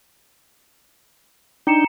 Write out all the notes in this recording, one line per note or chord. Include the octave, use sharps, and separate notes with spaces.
D4 D#4 G5 A#5 C#7 E7